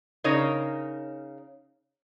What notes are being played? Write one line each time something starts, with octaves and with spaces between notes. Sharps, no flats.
C#3 D#4 A#4 C#5